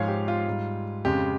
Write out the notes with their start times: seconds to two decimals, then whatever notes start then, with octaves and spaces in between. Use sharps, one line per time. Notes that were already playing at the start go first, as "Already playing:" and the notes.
Already playing: G#2 F3 G#3 C#5 F5
0.08 G4
0.28 F4
0.47 G#2 G3
1.05 F2 C#3 G#3 G4